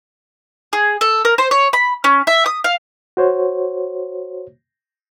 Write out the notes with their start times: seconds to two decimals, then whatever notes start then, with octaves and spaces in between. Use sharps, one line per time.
0.73 G#4
1.01 A4
1.25 A#4
1.38 C5
1.51 C#5
1.73 B5
2.04 C#4
2.27 E5
2.46 D#6
2.64 F5
3.17 F#4 C5 C#5